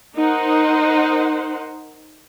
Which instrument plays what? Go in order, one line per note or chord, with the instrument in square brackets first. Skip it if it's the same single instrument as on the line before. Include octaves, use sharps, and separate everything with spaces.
[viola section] D#4 A#4 C5 F#5